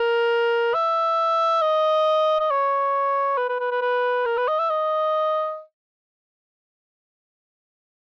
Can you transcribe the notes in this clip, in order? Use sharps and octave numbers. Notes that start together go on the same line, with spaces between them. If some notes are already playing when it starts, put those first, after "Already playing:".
Already playing: A#4
E5
D#5
D#5
C#5
B4
B4
B4
B4
B4
A#4
B4
D#5
E5
D#5